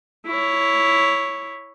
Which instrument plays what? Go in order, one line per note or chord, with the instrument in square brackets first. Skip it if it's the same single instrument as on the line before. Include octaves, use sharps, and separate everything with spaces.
[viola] E4 C#5